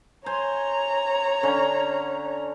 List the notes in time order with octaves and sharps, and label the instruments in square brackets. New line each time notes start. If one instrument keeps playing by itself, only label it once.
[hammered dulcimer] C5 G#5 C6 [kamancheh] C#5 A#5
[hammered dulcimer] D3 C#4